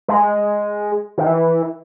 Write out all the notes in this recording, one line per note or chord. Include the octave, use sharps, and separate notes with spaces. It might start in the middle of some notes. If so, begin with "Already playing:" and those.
G#3
D#3
E3